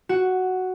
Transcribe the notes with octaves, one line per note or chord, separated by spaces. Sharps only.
F#4